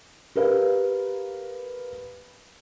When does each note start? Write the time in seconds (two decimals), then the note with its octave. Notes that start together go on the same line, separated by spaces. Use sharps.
0.36 G4 A#4 B4 F5